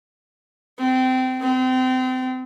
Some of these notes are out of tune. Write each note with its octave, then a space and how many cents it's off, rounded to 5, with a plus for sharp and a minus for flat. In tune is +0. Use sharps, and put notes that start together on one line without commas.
C4 -25
C4 -30